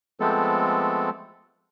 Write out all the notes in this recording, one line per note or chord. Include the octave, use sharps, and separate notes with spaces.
F3 G#3 A3 B3 C4 A4